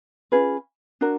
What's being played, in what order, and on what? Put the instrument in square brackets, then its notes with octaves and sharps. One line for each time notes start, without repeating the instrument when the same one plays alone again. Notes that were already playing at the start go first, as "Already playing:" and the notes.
[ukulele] C#4 F4 G#4 B4
D4 F#4 A#4